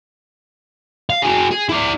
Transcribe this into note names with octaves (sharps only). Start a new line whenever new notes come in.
F5
F#4 G#4
G#4
E4 D5